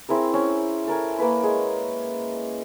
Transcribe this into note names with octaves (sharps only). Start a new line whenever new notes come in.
C4 E4 G#4 A#4
C#4 C5 C#5
A4 A#4 G#5
A#3 A#4 B4 B5
G#3 G#4